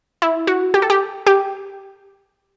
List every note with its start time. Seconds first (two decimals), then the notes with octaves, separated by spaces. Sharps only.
0.22 E4
0.47 F#4
0.74 G4
0.82 A4
0.90 G4
1.27 G4